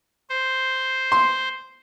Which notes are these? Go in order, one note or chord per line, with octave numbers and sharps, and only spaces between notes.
C5
C6